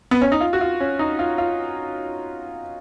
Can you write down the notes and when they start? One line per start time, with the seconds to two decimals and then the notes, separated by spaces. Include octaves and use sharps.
0.11 B3
0.22 C#4
0.32 D#4
0.41 F4
0.53 F#4
0.61 F4
0.80 C#4
0.99 D#4
1.19 F4
1.38 F4